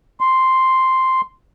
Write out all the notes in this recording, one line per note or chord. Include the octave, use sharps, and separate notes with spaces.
C6